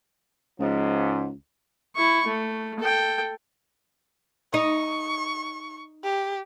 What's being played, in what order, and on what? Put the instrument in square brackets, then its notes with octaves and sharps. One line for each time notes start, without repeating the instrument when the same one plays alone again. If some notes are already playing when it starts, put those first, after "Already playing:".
[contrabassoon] C#2 [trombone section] G#2 F3
[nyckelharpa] E4 C#6
A3
A4 G5
[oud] D#4 [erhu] C#6
[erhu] G4